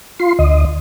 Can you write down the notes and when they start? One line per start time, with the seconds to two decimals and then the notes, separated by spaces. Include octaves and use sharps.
0.20 F4 C6
0.39 D2 D#5